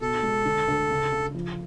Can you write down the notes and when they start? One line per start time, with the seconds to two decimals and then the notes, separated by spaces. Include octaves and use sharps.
0.01 B2 A4
0.23 G#3
0.45 D3
0.68 D2
0.90 C#3
1.12 C#3
1.35 F3